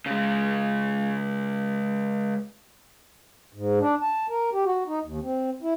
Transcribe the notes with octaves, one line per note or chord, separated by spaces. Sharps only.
C#3 G#3
G#2
D4
A5
A#4
G4
F#4
D#4
D#2
C4
E4